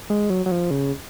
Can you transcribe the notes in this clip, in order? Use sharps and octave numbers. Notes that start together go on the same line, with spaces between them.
G#3
F#3
F#3
F3
C#3